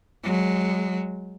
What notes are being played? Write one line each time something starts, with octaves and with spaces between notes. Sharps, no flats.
F#3 G#3